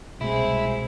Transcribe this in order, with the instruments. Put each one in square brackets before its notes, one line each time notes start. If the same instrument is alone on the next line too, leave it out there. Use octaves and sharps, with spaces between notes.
[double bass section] C2 [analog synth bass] B2 [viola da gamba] G#3 C4 G#4 [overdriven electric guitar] E4